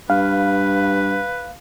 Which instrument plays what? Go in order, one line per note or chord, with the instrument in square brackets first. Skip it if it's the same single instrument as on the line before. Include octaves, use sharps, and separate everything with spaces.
[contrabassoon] G2 [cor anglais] B4 [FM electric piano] F5